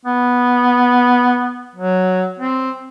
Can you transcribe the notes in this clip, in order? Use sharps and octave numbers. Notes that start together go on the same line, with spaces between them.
B3
F#3
C4